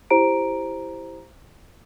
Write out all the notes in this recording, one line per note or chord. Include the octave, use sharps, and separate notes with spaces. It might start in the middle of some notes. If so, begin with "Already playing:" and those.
E4 G4 C5 A#5 D7